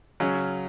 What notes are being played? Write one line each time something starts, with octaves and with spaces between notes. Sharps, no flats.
C#3 F#3 C#4